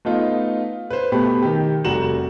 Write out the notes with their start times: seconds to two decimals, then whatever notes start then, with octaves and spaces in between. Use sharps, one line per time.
0.05 A3 B3 D#4 F4
0.90 B4 C5
1.12 B2 A3 G4 B5
1.42 D#3 G4
1.84 F1 G3 F#4 A#5 E7 F#7